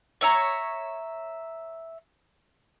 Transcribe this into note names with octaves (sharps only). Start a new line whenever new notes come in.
C#5 E5 A#5